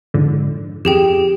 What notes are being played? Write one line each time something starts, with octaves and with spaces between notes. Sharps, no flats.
F2 G#2 D3
F2 G4 G#4 G5